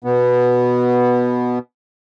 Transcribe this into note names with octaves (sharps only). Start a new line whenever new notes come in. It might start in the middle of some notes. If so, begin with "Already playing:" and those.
B2 B3